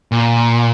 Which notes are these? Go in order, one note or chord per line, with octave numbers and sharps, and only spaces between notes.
A#2